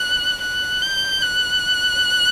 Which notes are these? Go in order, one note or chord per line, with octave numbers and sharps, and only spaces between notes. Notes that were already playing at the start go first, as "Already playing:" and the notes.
Already playing: F#6
F#6
G6
F#6